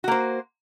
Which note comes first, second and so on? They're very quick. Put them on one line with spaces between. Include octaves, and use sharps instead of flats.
F#4 A#3 C5